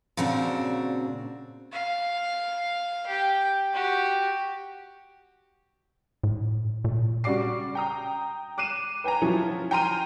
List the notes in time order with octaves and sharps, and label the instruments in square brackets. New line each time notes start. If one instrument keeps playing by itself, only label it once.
[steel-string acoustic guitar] A#2 C#3 C4 D4 F#4
[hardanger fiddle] F5
G4 G5
F#4 G4
[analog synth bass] A2
A#2
[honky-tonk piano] C#3 G3 F#4 D5 D6 C7
G5 A#5 D#6
D6 F#6 C7 D#7 E7
B4 G5 G#5 A#5
F3 F#3 C#4 E4
G5 G#5 A#5 C6 F6 D#7